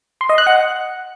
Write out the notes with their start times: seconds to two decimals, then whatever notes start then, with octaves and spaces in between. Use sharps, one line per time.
0.21 C6
0.29 D#5
0.38 F#6
0.47 F#5